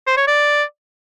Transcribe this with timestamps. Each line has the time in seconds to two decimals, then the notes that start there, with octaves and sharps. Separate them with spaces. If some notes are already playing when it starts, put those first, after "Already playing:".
0.07 C5
0.17 C#5
0.27 D5